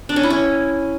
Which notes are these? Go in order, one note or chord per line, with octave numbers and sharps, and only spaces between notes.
D4
C#4
E4
C#4